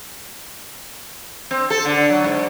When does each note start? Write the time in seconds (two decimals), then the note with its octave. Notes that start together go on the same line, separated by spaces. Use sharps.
1.51 C4
1.70 A4
1.85 D3
2.10 F#3
2.24 G#2